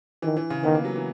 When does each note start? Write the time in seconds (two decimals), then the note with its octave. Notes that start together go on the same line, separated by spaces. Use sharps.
0.22 D#3 E3
0.37 E3
0.50 C#3
0.64 D#3 B3
0.74 A#3
0.85 F#3
0.96 E3